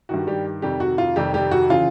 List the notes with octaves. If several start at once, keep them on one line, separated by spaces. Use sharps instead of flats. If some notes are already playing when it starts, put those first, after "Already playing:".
G2 D#3 F#4
G3 G4
F2 C3 D#3 G3 G4
F#4
F4
F2 C3 D#3 G3 G4
G3 G4
F#4
C#3 E3 F4